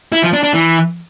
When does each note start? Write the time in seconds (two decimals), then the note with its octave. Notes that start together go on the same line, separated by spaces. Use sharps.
0.12 E4
0.23 F3
0.33 D4
0.43 D4
0.54 E3